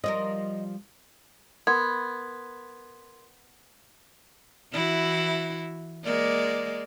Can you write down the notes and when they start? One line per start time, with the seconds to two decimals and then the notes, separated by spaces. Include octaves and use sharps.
0.04 F3 G3 A#4 D#5
1.67 B3 A#4 C6 G#6
4.73 E3 E4 F#4
6.04 G#3 A#3 D5